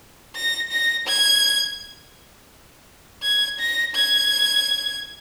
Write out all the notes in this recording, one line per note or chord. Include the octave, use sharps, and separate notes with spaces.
A#6
A#6
G#6
G#6
A#6
G#6